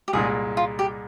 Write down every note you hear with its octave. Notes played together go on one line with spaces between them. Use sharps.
G4
C2 A#2 G#3 G#4
F4
G4